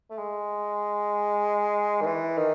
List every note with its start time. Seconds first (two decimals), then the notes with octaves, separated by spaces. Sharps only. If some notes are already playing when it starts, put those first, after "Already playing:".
0.11 A3
0.19 G#3
2.01 D#3
2.07 E3
2.38 D#3